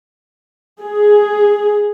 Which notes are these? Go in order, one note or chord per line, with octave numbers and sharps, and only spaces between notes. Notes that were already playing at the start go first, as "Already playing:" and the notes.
G#4